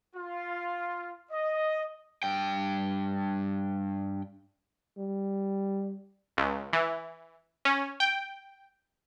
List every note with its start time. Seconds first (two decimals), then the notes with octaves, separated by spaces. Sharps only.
0.16 F4
1.31 D#5
2.23 G2 G5
4.98 G3
6.37 C#2
6.73 E3
7.65 C#4
8.00 G5